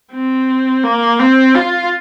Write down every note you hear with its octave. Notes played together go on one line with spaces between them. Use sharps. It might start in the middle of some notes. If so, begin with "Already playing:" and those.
C4
A#3
C4
F4